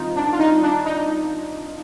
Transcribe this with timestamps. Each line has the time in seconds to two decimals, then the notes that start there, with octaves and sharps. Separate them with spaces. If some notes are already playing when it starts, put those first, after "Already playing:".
Already playing: D#3 G3 C4 D#4 F4
0.16 D4
0.33 F4
0.40 D#4
0.63 D4
0.86 D#4